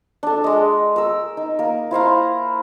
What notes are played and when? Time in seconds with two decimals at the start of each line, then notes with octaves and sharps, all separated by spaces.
0.23 D4 A4
0.44 G#3 D#5
0.96 A#4 E6
1.37 D#4
1.59 A#3 A#4
1.91 E4 C5 F5 A#5